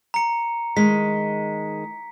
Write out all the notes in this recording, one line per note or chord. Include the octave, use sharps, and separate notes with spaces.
A#5 C#7
D#3 G#3 B6